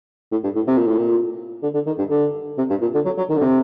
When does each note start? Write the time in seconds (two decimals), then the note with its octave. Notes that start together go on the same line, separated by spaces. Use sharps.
0.32 A2
0.44 G2
0.56 A2
0.67 C3
0.78 A#2
0.87 A2
0.98 A#2
1.63 D3
1.74 D3
1.87 D#3
1.98 G2
2.10 D3
2.58 C3
2.70 G2
2.82 A#2
2.94 D3
3.05 F#3
3.18 F#3
3.30 D#3
3.38 D3
3.41 C3